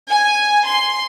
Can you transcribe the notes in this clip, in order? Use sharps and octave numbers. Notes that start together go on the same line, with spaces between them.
G#5
C6